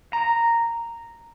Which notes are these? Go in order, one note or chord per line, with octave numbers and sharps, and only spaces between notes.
A#5